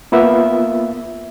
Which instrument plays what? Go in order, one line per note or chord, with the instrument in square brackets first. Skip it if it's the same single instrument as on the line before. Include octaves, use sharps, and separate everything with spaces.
[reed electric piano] A#3 B3 F4 E5